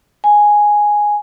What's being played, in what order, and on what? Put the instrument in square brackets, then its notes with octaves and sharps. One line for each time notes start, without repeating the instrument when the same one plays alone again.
[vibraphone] G#5